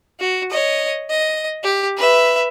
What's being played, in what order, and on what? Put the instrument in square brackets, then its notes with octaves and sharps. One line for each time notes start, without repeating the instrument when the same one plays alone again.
[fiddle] F#4
C#5 D#5
D#5
G4
B4 E5